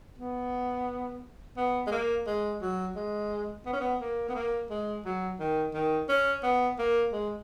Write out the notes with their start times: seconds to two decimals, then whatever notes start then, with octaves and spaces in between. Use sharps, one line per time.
0.18 B3
1.57 B3
1.87 G#3
1.92 A#3
2.27 G#3
2.62 F#3
2.96 G#3
3.66 B3
3.73 C#4
3.80 B3
4.00 A#3
4.29 B3
4.35 A#3
4.70 G#3
5.05 F#3
5.40 D#3
5.74 D#3
6.09 C#4
6.43 B3
6.79 A#3
7.13 G#3